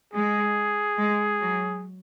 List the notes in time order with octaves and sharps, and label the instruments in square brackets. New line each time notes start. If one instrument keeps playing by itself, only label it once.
[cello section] G#3 [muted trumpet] G#4
[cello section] G#3
F#3